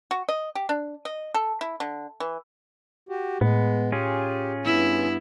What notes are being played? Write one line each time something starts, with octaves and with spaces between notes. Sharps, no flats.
F#4
D#5
G4
D4
D#5
A4
E4
D3
E3
F#4 G4
A2 G#3 B3
C#4 F4 G4 G#4
G2 B3 E4